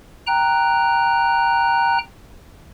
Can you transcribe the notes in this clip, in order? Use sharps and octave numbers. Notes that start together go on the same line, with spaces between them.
G5 A#5 F#6